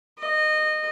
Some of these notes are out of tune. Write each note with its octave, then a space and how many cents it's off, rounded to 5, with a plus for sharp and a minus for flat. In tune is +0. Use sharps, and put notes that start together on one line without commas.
D#5 -20